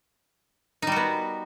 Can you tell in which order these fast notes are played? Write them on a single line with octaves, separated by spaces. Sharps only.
D#4 G3 F#4 B3